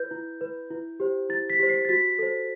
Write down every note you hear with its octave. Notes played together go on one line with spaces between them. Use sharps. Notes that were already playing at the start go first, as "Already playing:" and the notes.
Already playing: E4 B4 G6
E4
B4
E4
G4 C5
E4 A6
B6
G4 C5
C7
A6
F#4 B6
A4 C5